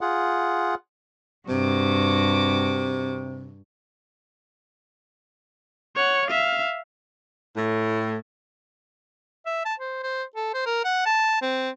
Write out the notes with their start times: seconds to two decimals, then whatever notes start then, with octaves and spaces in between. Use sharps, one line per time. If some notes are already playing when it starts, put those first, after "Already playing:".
0.01 F4 G#4 F#5
1.49 G2 C3 F#4 D6
5.96 C#5 F#5
6.28 E5 F5
7.56 A2
9.46 E5
9.65 A5
9.80 C5
10.03 C5
10.36 A4
10.54 C5
10.66 A#4
10.85 F#5
11.06 A5
11.42 C4